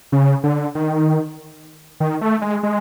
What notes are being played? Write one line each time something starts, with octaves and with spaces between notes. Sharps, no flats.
C#3
D3
D#3
D#3
A3
G#3
G#3